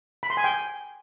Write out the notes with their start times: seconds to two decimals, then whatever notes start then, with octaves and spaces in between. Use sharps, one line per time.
0.23 B5
0.30 C6
0.37 G#5
0.44 G5